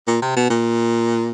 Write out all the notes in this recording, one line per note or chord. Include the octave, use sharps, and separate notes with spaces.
A#2
C3
B2
A#2